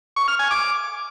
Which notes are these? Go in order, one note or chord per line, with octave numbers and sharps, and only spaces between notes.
C#6
F6
G#5
D6